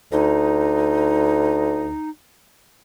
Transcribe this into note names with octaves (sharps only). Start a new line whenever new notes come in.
D2 D#4